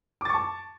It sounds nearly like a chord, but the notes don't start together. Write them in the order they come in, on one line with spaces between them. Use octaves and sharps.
D6 A6 C#6 A5